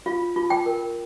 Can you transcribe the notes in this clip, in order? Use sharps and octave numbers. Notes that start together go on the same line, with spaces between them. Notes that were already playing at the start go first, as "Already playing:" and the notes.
F4 F5
F4
G5
A#4